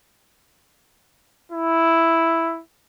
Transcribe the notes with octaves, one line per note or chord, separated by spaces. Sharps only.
E4